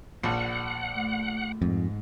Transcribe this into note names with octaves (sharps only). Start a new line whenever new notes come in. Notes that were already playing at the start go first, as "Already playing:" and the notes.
A#1 F#5
A3
F2 G#2